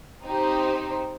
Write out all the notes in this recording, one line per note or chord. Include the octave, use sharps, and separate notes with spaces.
C4 D#4 G4 C5